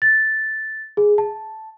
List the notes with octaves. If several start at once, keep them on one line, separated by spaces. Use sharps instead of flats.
A6
G#4
A5